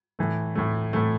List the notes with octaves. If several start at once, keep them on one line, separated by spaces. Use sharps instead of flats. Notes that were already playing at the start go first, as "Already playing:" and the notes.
A2 E3 A3
A2 E3 A3
A2 E3 A3